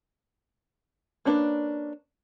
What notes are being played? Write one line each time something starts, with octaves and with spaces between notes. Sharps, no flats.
A#3 C#4 D4 B4 D5